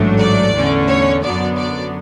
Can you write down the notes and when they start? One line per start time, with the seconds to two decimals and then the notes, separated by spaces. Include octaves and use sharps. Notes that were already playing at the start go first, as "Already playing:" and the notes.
Already playing: A1 G#2 F#3 A3 D4
0.18 D5
0.52 E2 D3 A3 C#4
0.88 C#5
1.23 F#2 D3 F#3 B3 D5
1.57 D5